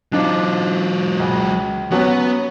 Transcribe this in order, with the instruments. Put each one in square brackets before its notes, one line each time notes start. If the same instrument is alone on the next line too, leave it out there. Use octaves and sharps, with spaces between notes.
[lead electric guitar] F#3 F4 [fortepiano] C4 D4 D#4
[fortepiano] C#2
[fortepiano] F#3 C#4 F#4 [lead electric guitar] B3